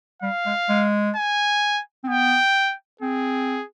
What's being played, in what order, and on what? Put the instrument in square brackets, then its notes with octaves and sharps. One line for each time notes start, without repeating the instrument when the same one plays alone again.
[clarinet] G3 [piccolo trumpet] F5
[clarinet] G#3
G#3
[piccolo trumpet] G#5
[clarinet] C4
[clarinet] B3 [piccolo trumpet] G5
[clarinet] C4 [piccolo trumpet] G#4